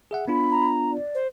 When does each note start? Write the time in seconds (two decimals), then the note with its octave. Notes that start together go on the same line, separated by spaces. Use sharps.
0.11 G#4 E5 F#5
0.28 B3 D4 F4 B5
0.52 A#5
0.91 D5
1.15 C5